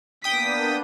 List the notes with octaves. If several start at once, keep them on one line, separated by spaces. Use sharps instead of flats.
A#3 B3 D4 G5 D#6 B6